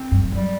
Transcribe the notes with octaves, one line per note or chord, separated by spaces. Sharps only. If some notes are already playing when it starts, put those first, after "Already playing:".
Already playing: C4
G2
F2
F#2 G3